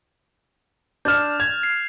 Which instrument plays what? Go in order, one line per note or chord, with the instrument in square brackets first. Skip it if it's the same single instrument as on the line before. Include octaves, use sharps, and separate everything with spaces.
[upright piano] D4 F6 [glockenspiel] G6 A6 E7
[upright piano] G#6 [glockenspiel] F7
[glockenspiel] C7